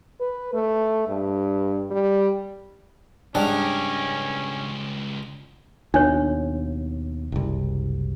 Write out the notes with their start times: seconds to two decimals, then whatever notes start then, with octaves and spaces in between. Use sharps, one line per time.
0.21 B4
0.54 A3
1.08 G2
1.91 G3
3.35 C#2 G#2 G3 C#4 D4 A#4
5.94 D#2 B2 D4 C#5
7.32 F#1 C2